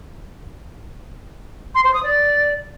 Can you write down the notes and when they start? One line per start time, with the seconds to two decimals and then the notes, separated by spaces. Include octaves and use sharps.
1.75 C6
1.84 C5
1.94 D#6
2.03 D5